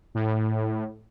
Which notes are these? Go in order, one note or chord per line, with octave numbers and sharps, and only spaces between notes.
A2